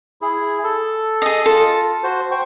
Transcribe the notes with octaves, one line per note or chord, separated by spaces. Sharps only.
E4 G#4
A4
G#4 D#5
F4 A4
F#4 C5
C5 G5 C#6